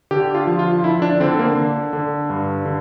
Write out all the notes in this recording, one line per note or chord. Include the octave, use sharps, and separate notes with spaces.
D3 G4
F4
F3
F4
D3 E4
D4
D3 C4
A#3
D3
D3
G2
D3